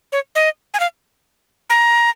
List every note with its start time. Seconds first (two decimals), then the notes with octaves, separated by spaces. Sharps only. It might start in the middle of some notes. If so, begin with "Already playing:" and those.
0.12 C#5
0.35 D#5
0.74 G#5
0.80 F5
1.70 A#5